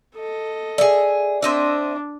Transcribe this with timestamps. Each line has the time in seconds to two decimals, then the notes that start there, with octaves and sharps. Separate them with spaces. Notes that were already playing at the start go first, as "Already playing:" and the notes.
0.16 A4 D#5
0.78 G#4 D5 E5
1.42 C4 D4 D#5 E5